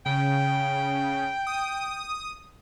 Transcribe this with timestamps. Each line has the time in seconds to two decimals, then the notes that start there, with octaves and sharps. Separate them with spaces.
0.06 C#3 G5
1.47 D#6